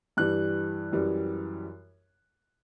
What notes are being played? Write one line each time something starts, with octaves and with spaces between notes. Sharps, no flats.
G2 E3 G3 F#6
F#2 E3 G3